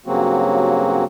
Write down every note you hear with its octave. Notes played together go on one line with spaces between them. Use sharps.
G2 C#3 F#3 A#3 C4 F#4